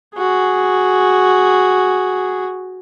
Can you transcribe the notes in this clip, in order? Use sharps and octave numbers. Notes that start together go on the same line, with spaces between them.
F#4 G#4